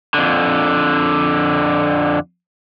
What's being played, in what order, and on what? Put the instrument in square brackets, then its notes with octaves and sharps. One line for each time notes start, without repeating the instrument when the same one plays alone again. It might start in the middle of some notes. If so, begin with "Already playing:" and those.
[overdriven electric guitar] F2 D3